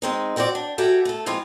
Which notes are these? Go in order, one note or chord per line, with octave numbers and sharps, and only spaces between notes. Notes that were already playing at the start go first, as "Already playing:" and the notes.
G#3 C4 D#4
F3 C4 F#4 C5 D5
D4
F#4 G4 A4 E5 G5 G#5
A3 A4
E3 F3 G#3 C4 F4